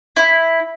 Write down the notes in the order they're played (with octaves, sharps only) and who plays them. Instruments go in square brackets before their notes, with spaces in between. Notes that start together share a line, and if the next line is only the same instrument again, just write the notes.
[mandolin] E4